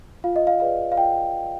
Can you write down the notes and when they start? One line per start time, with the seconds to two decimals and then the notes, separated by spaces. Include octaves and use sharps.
0.24 F4 F5
0.36 D#5
0.47 F5
0.60 G#4 B4 D5 F5
0.92 F5
0.97 F4 G5